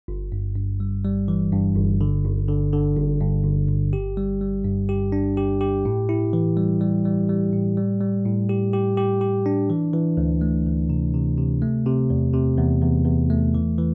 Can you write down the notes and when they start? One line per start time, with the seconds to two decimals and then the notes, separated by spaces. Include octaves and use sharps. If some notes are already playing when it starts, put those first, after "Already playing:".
0.08 G1
0.32 G2
0.56 G2
0.80 G3
1.05 G3
1.28 E3
1.52 G2
1.76 G1
2.01 D3
2.24 G1
2.48 D3
2.73 D3
2.96 G1
3.21 G2
3.44 G1
3.69 G1
3.93 G4
4.17 G3
4.41 G3
4.64 G2
4.89 G4
5.12 D4
5.37 G4
5.61 G4
5.85 A2
6.09 E4
6.33 E3
6.57 G3
6.81 G3
7.05 G3
7.29 G3
7.53 A2
7.77 G3
8.01 G3
8.25 A2
8.49 G4
8.73 G4
8.97 G4
9.21 G4
9.46 D4
9.70 E3
9.93 E3
10.17 D2
10.41 A3
10.66 D2
10.90 C3
11.14 C3
11.38 C3
11.62 A3
11.86 C3
12.10 E2
12.34 C3
12.58 E2
12.82 E2
13.05 E2
13.30 A3
13.55 E3
13.78 E3